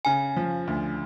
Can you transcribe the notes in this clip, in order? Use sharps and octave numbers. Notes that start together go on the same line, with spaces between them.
C#3 G#5
F3
D2